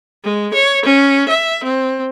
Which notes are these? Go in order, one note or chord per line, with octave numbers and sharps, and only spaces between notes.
G#3
C#5
C#4
E5
C4